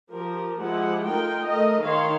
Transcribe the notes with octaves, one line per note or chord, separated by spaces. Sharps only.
F3 G4 A#4
F3 G#3 E4 G4 F#5
A3 D#4 F4 A#4 G5
A3 A#4 D#5
D#3 C#5 F5 C6